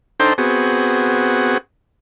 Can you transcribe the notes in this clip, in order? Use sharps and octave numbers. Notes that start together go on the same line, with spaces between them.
D4 D#4 A4 C5 G5 C6
B3 C4 F#4 G#4